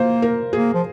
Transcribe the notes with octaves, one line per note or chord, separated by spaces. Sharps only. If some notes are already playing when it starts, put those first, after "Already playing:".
Already playing: A#3 F4 C5
A#4
A#3 G#4
F3